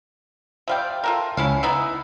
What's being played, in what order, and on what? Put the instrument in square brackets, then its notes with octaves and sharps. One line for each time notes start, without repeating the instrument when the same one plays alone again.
[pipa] F3 G3 D5 [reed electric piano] E5 F5 G5
[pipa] F4 A4 A#4
[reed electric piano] C#2 [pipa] C#4 E4 F5
[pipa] B3 D#4 E4 [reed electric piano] E6